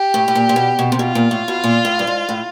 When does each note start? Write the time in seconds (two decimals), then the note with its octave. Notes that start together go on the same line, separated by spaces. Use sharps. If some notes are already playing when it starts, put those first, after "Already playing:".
Already playing: G4
0.14 A2
0.28 A2
0.35 A#2
0.49 A#2
0.56 B2
0.79 B2
0.92 C3
0.99 B2 F4
1.15 A#2
1.31 A2
1.48 B2
1.64 A#2
1.85 A2
1.99 G2
2.07 G#2
2.29 A2